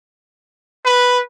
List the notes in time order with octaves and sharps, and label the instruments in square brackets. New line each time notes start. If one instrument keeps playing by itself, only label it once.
[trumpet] B4